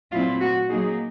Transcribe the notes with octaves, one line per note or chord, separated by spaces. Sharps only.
A#2 F#3 A3 C4 E4 F4
F#4
F#3 A#3 D#4 G#4